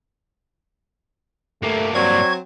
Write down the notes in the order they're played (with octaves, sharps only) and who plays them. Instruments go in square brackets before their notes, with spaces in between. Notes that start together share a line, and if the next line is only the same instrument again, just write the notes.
[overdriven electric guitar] G2 A#3 [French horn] A3
[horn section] F#3 C4 [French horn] D5 [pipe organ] C#6 G#6